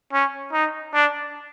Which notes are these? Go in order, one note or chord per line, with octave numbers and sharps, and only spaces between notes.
C#4
D#4
D4